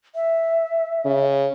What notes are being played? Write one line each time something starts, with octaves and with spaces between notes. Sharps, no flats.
E5
C#3